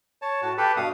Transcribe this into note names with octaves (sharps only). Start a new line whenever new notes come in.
C#5 A5
A2 F#4 A5
G4 A4 B4
G2 B2 F5 D#6